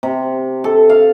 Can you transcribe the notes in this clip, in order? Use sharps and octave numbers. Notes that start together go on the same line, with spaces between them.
C3
A4
F5